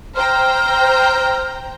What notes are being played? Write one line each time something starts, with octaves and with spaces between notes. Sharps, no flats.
C5 G5 A#5 F6